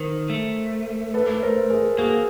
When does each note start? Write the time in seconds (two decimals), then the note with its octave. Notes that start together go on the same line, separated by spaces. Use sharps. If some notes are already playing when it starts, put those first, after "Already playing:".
Already playing: D#3 A#4 C5
0.30 A3
1.14 A4 B4
1.43 A#4 C5
1.70 G#4 A#4
1.98 A#3 F#4 G#4